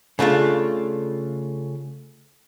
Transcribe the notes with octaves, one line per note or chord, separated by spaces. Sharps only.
C#3 A3 D4 F4